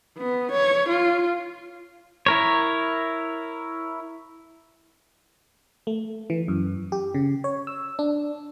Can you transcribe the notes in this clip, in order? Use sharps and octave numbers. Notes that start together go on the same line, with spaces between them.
B3
C#5
F4
E4 A#4 C#5
A3
E3
F#2
G4
C#3
C#5
E6
D4